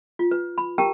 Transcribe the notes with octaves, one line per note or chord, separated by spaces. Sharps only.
F4
B4
B5
G4 A#4 G5 A5 A#5